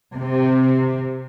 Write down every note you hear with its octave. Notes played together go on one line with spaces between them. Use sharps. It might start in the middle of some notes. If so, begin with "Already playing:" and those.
C3